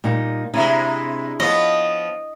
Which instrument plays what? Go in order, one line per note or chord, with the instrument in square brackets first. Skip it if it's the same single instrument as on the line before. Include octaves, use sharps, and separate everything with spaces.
[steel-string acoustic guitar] A#2 G3 D#4
[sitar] C3 G#3 [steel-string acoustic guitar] D4 E4
[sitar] F3 B3 [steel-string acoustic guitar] C#5 [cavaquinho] D#5